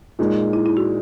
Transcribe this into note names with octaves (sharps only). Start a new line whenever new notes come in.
A#2 G#3 D#4
E4
E4
F#4